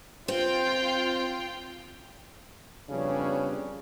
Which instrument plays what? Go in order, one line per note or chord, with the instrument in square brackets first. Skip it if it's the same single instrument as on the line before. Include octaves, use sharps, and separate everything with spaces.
[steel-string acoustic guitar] C4 [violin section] F4 G5
[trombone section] F2 C#3 G3 B3 C#4 D4